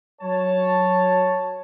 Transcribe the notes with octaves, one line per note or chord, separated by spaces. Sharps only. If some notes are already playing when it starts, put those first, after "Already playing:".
F#3 C#5 A5